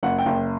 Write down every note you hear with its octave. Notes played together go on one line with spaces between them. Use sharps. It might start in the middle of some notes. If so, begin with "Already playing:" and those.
F#1 F#5
G5
F#1